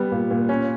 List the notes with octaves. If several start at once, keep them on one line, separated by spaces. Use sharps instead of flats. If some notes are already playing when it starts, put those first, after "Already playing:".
Already playing: G3 B3
A#2
A#2
C#4